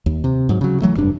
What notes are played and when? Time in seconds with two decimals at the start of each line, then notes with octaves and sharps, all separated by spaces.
0.06 D#2
0.24 C3
0.49 G#2 F#3
0.61 C#3 F#3
0.82 E3 F#3 A3
0.96 F1 G2 D4